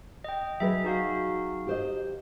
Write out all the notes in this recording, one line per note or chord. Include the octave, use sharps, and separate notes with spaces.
D#5 G5
F#3 G#4 B4 D#5 E5
D#4 F#4 F5
G4 C5 D#5